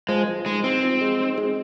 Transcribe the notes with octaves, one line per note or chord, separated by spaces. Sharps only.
F3 G#3
F3
G#3 D#4
C4 D#4
F3
G#3
D#4
G#3